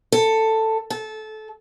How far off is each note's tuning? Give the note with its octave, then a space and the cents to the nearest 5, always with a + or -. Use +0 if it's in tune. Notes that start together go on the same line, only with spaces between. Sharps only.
A4 +10
A4 -20